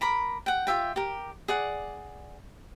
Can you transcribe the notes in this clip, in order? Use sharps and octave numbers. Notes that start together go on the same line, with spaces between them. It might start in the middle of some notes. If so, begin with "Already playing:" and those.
A#4 A#5 B5 D6
F#5 G5
F4 G4 E5 G5
G4 A#4
G#4 D5 F#5